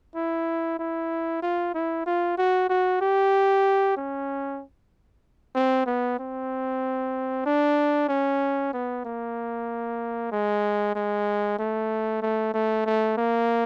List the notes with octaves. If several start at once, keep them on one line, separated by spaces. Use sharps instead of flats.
E4
E4
F4
E4
F4
F#4
F#4
G4
C#4
C4
B3
C4
D4
C#4
B3
A#3
G#3
G#3
A3
A3
A3
A3
A#3